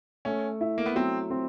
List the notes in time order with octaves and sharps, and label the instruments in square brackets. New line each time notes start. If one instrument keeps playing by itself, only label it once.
[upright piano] A3 [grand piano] C#4
[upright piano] E4
[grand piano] A#3
B3
[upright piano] F#3 [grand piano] C4
[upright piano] C4